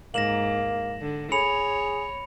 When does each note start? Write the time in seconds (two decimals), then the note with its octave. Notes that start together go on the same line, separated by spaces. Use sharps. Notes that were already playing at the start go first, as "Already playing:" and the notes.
0.14 G#2 A#3 A#6 E7 F#7
1.01 D3
1.32 G#4 C#5 B5 C#7 F7